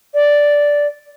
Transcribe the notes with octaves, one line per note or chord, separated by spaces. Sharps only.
D5